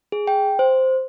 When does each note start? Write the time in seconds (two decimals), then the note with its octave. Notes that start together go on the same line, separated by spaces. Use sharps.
0.12 G#4
0.27 G5
0.59 C5